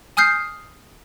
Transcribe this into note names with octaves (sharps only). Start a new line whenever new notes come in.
G#5 D#6 F6 G6 C7